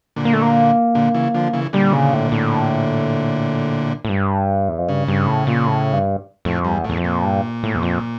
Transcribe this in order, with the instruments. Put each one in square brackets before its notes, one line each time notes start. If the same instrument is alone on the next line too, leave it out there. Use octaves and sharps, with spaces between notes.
[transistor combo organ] A#2 D3
[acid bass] A#3
A3
A#3
[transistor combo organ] A#2 D3
C#3 E3
D3 F3
C#3 E3
[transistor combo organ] A#2 D3 [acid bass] G3
[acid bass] C#3
A2
A2
A2
G2
E2
F2
[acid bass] G2 [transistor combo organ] C#3
[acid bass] G2
A2
A#2
A2
G2
[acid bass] F2 [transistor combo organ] A2
[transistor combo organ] G2
[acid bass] E2
[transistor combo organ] A2
[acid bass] E2
F2
[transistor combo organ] A#2
[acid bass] G2
A2
E2
F2